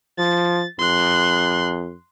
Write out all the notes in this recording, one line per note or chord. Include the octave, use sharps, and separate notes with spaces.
F3 A6
F2 C6 F#6